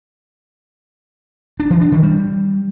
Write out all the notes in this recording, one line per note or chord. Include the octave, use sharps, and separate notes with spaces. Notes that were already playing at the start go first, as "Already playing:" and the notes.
D4
E3
D4
D#3
G3